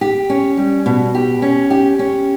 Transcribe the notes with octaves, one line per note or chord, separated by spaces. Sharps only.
G4
C#4
G3
B2
G4
C#4
G4
C#4